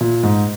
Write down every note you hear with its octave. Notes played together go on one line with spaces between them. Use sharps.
A#2
G#2